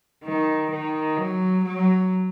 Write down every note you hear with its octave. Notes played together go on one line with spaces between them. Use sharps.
D#3
D#3
F#3
F#3